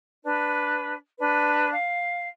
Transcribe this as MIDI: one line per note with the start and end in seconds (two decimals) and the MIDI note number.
0.24 0.93 62
0.24 0.93 71
1.17 1.70 62
1.17 1.70 71
1.71 2.27 77